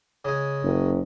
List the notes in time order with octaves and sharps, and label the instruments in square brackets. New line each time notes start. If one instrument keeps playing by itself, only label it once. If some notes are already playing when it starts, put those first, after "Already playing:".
[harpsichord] C#3 G#3
[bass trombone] F#1